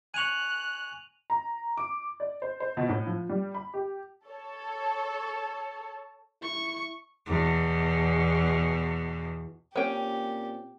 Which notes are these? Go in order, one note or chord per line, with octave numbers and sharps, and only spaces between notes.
G#5 C#6 F#6 D#7 F7 F#7
A#5
D6
D5
C5
C5
B2
A2
F3
G3
B5
G4
A4 C#5 A5
E4 C#6
E2 B2
A#2 C4 C#4 G4 G5